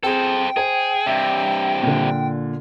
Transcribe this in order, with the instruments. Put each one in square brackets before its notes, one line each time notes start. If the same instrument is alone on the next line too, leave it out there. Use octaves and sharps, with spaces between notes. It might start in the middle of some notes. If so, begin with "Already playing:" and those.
[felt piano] C4 G#4 [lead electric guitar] A4 C5 [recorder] G5
[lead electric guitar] G#4 [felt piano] C5 G#5
[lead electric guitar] G2 C3 [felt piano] E5
[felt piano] A#2 D3